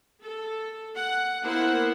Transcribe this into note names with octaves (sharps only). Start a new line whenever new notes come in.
A4
F#5
A#3 B3 E4 A#4 C5 F#5